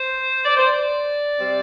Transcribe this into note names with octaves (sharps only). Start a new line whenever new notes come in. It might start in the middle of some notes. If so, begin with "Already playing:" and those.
Already playing: C5
D5
C5
D5
C3 G3 C4